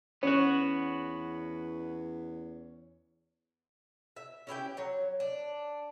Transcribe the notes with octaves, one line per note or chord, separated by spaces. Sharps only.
E2 B3 C#4 F#4
E5
C#4 E4 G4 G5
F#3 C#5
D4